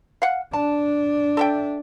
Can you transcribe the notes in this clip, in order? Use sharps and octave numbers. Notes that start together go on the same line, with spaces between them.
F5 F#5
D4 A5
A4 E5 G5